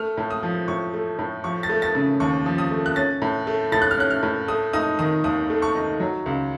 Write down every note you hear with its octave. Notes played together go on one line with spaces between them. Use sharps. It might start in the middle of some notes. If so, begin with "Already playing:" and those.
Already playing: A3 F6
A2
D#6
F3
A2 C#6
A3
A2
F3 C#6
A6
A3
A6
C#3
D#2 C#6
F3
D#6
A3
F#6
C#4 A6
A2
A3
A2 A6
F#6
F6
C#4 F#6
F6
A2
A3 D#6
D#4 D#6
D#3 D#6
D#2 D#6
A3
C#6
D#4
F#3
C#2